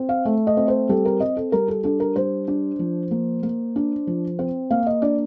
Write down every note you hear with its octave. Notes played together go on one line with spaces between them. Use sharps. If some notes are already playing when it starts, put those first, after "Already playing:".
Already playing: C4
F5
A3
D#5
C4
C5
G3 A4
A#4
C4 D#5
A4
G3 A#4
A4
D4 A4
A#4
G3 C5
D4
F3
A#3
A#3
D4
F3
C4
A#3 F5
D#5
D4 D5